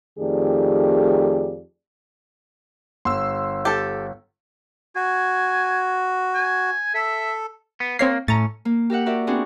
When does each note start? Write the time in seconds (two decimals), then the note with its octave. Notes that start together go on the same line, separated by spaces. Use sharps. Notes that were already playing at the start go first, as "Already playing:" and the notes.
0.19 F2 D#3 A3 G4 G#4 D5
3.05 G1 C6 E6
3.65 G4 A4
4.96 F#4 G#5
6.35 G#5
6.94 A4 E5
7.80 B3
7.99 A#3 C4 C#5 C7
8.28 A2 C#4 A#5 A6
8.65 A#3
8.90 G4 A#4 E5 F#5
9.06 F#4 A#4 D5 E5
9.27 B3 C4 D4 F#4 G#4